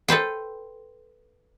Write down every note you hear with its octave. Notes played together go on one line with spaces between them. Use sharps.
A4 B4 C5 G5